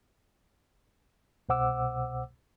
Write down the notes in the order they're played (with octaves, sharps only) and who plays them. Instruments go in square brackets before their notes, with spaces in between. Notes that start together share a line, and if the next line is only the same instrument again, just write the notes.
[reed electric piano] C2 B2 C5 F#5 D6 E6